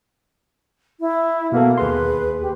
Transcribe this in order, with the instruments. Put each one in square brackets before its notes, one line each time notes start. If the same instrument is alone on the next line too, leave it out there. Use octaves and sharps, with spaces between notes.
[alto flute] E4
[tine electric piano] B2 B3 A4 [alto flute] A#3
[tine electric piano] D#2 G#4 C6 [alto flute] B4
[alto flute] G4